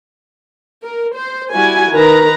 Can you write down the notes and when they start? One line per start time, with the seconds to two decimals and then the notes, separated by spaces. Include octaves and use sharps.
0.84 A#4
1.15 C5
1.53 G3 E4 F#4 G#5
1.91 D#3 B4 A#5